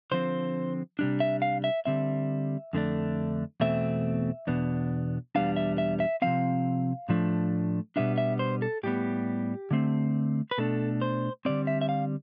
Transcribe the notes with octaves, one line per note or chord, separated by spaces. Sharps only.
D3 F3 C4 C5
C3 G3 D4
E5
F5
E5
D3 G3 C4 E5
F2 D3 A3 D4
E2 B2 A3 C4 E5
E2 B2 B3 D4
E2 B2 G3 B3 D4 F5
E5
E5
E5
C3 F3 C4 F5
A2 F3 A3 D4
B2 G3 B3 D4 E5
E5
C5
A4
A2 G3 B3 G4
D3 A3 C4
B4
B2 A3 D4 A4
C5
D3 G3 C4 D5
E5
E5
F5